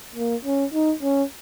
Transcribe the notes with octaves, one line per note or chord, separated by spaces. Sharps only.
A#3
C#4
D#4
C#4